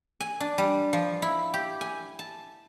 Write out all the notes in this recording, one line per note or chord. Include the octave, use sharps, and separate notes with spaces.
G#5
D4
G3
F3
E4
G4
G#5
A5